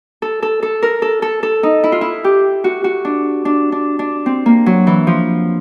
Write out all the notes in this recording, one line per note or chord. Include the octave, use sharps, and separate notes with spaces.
A4
A4
A4
A#4
A4
A4
A4
D#4
E4
F4
E4
G4
F#4
F#4
D4
D4
D4
D4
C4
A#3
F#3
E3
F3